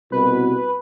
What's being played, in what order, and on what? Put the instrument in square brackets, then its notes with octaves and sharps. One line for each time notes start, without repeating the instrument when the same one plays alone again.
[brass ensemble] C2 B2 [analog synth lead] B4